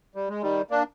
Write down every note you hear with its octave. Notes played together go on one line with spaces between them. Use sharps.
G3
G#3
D#3 G3
A#3 D4